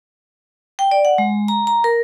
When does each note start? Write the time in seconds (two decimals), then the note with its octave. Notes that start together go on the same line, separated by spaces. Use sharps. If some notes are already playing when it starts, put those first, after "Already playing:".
0.79 G5
0.91 D5
1.05 F#5
1.18 G#3
1.48 A#5
1.67 A#5
1.84 A#4